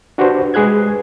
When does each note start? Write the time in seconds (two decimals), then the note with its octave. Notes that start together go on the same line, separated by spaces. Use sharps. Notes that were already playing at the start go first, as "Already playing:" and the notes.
0.18 D4 F#4 G4 B4 C5
0.54 G#3 G#4 B4 F#6 G#6